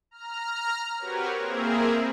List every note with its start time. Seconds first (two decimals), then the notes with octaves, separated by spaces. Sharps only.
0.11 A#5 F6
0.99 C4 F#4 G4 A#4 B4 C#5
1.38 A#3 C4 E4 G#4 A#4